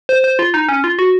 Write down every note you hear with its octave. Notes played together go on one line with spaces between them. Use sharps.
C5
C5
F4
D#4
C#4
F4
F#4